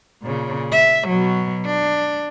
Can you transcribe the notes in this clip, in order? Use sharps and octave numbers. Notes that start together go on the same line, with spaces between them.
A#2 C#3
E5
B2 F#3
D4